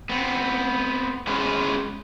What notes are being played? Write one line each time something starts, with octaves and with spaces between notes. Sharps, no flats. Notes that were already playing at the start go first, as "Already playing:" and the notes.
B3 C4
G#3 B3 C#4 G#4 B4 C5